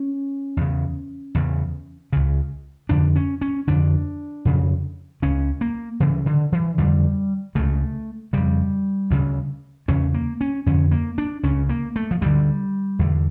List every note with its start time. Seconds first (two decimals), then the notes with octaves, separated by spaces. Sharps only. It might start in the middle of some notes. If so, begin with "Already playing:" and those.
Already playing: C#4
0.57 E2 C#3
1.35 E2 C#3
2.13 C#2 C#3
2.89 F2 D3 D4
3.16 C#4
3.41 C#4
3.67 F2 D3 D4
4.45 F2 C#3
5.22 C#2 C#3 C#4
5.61 A#3
6.00 D2 C#3 E3
6.26 D3
6.52 E3
6.78 F2 D3 G3
7.55 C#2 C#3 A3
8.33 F2 C#3 G3
9.10 D2 C#3
9.88 E2 C#3 C#4
10.14 A#3
10.41 C#4
10.66 F2 D3 C#4
10.91 A#3
11.18 D4
11.43 C#2 C#3 C#4
11.69 A#3
11.96 A3
12.11 F3
12.21 D2 D3 G3
12.99 E2 D3